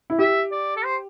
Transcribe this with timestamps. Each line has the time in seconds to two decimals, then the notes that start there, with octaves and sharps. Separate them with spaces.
0.10 E4
0.19 G4 E5
0.51 D5
0.76 A4
0.84 C5